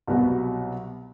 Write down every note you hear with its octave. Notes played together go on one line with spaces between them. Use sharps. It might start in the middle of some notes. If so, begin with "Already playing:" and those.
C2 B2 F#3 B3 F#4